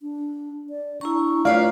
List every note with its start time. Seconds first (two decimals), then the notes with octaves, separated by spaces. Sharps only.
0.02 D4
0.70 D5
1.01 D4 E4 A#5 C#6
1.45 A3 F4 B4 C#5 D5 F5 A#5